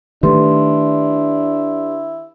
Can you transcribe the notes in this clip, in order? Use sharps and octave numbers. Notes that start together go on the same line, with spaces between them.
D#3 A3 D4 E4 G4 B4 C6